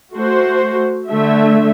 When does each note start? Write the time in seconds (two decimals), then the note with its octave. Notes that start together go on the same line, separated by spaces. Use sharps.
0.14 A3 F#4 C5
1.08 D3 A3 E5